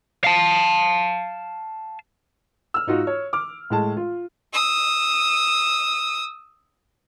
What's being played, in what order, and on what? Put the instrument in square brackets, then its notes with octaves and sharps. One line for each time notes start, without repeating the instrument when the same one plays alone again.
[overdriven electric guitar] F5 A5
[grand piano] E6 F6
G#2 D#4 F4 F#4
C#5
D6 F6
A2 G#3 A5
F4
[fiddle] D#6 E6